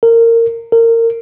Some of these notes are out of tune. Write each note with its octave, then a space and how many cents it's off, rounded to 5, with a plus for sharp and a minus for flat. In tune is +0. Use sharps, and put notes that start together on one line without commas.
A#4 -20
A#4 -25